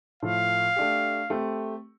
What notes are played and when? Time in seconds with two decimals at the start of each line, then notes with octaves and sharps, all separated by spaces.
0.22 A2 F3 A3 F5
0.76 A3 D4 G4
1.30 A3 C4 G4